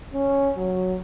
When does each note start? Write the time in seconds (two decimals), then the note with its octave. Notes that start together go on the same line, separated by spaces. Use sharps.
0.14 C#4
0.57 F#3